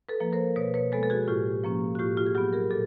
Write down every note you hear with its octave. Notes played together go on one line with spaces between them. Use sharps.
A4 B4
F3 A#3
A#4 C5
B2 B4 C#5
B4 C#5
G#3 B3 A4 B4
A4
F#4 G#4
G#4
A2 F4 G4
F3 A#3 C#4
F#4
A2 F4 G4
F4 G4
G#4
F#3 B3 F4 G4
G#4 A#4
A#2 A4